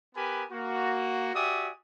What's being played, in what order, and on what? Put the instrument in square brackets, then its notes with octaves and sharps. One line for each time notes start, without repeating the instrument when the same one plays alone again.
[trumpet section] B3 G4 A#4 B4 G#5 B5
A#3 F#4
F#4 G4 D5 E5 G#5 D#6